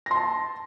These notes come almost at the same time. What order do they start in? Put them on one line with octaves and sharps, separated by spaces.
A#6 C6 A5